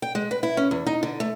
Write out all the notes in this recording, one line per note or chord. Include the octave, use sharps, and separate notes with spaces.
G5
G#3
B4
E4
C#4
E2
D#4
D3
A3